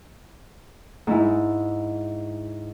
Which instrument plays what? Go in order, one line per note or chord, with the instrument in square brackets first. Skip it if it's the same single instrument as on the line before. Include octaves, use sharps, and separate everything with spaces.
[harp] G#2 G#3 E4